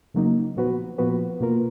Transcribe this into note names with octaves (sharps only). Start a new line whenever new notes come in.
C#3 F#3 A#3 D#4
A#2 F3 B3 F#4 B4
A#2 F3 B3 F#4 B4
B2 A#3 F4 A#4